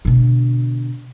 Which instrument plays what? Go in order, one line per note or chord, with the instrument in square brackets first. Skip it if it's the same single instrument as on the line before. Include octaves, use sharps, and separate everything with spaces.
[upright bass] B2 D3